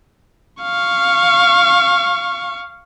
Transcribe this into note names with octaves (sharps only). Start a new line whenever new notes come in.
F5 C#6